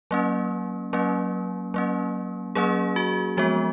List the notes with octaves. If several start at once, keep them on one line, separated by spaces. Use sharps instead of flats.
F#3 A#3 C#4
F#3 A#3 C#4
F#3 A#3 C#4
F#3 A#3 C#4 G#4
F#4
F3 G#3 B3 F#4